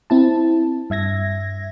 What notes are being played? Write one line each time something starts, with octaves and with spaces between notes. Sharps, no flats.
C4 E4 A5
G2 E5 G#6 A#6